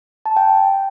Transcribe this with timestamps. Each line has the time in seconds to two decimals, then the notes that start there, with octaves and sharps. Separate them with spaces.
0.26 A5
0.36 G5